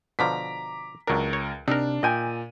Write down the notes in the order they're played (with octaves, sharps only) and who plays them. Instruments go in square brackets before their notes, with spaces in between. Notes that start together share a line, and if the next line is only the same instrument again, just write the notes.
[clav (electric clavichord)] B2 D3 F3 [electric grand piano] A#5 D6 B6
[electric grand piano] C#2 A#4 [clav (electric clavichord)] F#3 D4
[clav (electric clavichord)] C#5
[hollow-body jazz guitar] C3 [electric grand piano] D4 [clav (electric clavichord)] D#4 A#4
[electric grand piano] A#2 D#7 [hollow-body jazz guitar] D#5 G5 G#5